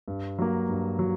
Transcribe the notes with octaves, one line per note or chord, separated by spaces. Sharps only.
G2
F#3 A#3
G2
F#3